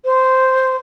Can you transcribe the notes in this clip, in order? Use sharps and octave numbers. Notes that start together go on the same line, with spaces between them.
C5